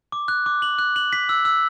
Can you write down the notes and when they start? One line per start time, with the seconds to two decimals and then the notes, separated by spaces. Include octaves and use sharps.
0.12 D6
0.28 F#6
0.46 D6
0.62 F#7
0.79 F#6
0.96 F#7
1.13 B6
1.29 E6
1.45 E6